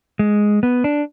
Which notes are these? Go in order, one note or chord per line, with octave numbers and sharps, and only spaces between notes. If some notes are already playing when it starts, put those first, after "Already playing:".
G#3
B3
D4